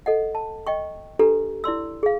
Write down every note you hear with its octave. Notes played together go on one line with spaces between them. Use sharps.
A4 D#5 F#5
A5
D#5 G5 C#6
D4 G4 A4 B4 A#5
E4 D5 C6 E6
G#4 F5